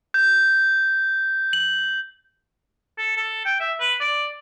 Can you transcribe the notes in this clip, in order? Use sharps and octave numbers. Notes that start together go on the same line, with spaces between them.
G6
F#7
A4
A4
G5
E5
B4
D5